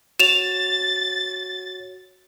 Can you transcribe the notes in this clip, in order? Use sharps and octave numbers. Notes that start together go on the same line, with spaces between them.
F#4 C#5 A6 E7 F7